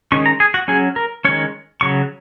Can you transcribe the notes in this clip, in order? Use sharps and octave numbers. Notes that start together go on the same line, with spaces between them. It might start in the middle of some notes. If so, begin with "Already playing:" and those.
D#3 G#3 C#4 C#6
A#5
G#4
F#4
F#3 C#4 G#4
A#4
D#3 G#3 C#4 C#5
C#3 F#3 C#6